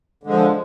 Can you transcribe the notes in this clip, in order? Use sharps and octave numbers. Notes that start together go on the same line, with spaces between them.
D3 F3 G#3